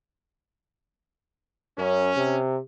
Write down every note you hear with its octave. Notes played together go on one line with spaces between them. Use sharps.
F#2 C#4
C3